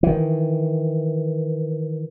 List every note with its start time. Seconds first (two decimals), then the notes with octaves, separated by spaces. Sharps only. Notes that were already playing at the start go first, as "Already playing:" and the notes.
0.03 D#3 E3